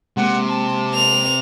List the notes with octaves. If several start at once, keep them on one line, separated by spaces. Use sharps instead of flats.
C3 G#3 A#3 F#5
A5
F7